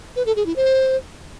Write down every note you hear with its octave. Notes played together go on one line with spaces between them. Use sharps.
B4
A4
G#4
E4
C5